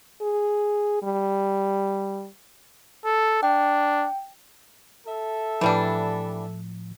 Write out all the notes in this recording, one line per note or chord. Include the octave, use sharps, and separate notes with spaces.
G#4
G3
A4
D4 G5
A4 E5
A2 E3 F3 G3 D4